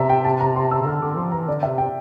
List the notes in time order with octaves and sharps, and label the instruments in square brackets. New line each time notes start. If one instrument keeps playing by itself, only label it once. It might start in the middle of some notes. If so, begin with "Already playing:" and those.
Already playing: [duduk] C3 [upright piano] E5 A5 A#5
[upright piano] G5
A5
A#5
C6
E6
[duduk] C3
[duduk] D3 [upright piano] F6
[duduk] D3 [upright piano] D6
[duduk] F3 [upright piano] C6
[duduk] E3 [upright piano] A#5
[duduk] D3 [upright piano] D5
[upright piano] E5
[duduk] C3
[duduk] C3 [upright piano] G5